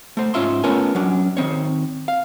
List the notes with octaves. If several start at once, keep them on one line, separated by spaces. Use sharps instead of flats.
A3 C5
G#2 F3 C#4 F4 E5 C6
A3 B3 C#4 F4 A#4 G#5
F#3 C#4 D4
D#3 C4 C#5
F5